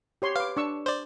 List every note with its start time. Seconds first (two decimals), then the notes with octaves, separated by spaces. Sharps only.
0.22 G4 C#5 C6
0.36 B4 F5 D6
0.57 D4 C#6 E6
0.86 C5 D5